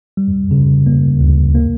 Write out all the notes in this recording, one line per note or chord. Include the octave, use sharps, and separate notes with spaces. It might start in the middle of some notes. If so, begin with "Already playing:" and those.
G3
C#3
A#3
D2
A#3